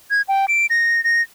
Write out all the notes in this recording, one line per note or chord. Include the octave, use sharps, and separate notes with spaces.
G#6
G5
D7
A#6
A#6